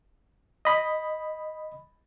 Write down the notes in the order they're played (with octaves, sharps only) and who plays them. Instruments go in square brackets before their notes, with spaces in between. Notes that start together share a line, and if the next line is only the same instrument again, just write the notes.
[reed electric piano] D#5 B5